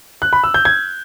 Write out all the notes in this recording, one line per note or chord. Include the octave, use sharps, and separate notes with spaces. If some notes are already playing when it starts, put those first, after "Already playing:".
F#6
B5
E6
G6
G#6